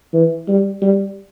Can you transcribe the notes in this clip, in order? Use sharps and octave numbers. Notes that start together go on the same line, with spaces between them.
E3
G3
G3